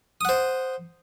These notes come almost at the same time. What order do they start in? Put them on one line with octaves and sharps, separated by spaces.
D#6 F#5 C5